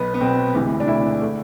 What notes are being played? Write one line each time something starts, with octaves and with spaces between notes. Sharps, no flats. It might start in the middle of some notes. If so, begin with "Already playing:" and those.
Already playing: B1 B2 B3
B3
B1 B2 C4
E1 D2 C3 E3
D4
E1 D2 C3 E3 E4
D3 A3